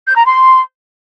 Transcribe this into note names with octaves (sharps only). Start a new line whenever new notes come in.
G6
A#5
C6